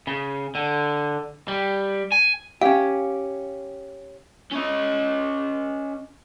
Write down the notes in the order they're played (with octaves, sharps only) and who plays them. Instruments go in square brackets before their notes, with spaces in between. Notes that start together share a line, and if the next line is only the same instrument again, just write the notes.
[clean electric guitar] C#3
D3
G3
G#5
[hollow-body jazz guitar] C#4 G4 [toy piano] F5
[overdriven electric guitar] C#4 D#5